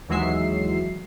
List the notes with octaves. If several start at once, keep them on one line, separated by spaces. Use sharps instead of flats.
D#2 E3 F#3 G#3 E5 C7